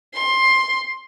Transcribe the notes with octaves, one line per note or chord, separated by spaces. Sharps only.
C6